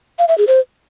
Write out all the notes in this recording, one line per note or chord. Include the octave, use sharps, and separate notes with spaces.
F5
E5
G#4
C5